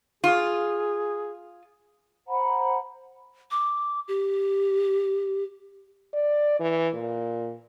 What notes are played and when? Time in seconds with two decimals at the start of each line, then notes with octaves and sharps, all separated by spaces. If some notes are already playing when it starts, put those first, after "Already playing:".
0.24 F4 G#4
2.28 C5 F#5 A#5 B5
3.51 D6
4.08 G4
6.14 D5
6.60 E3
6.94 A#2